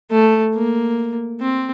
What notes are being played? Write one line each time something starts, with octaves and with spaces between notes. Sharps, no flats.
A3
A#3
C4